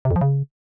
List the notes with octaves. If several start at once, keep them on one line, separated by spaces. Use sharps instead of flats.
C3
F2
F3
C#3